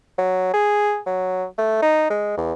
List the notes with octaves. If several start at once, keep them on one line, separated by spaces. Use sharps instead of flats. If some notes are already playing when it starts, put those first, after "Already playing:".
F#3
G#4
F#3
A3
D#4
G#3
E2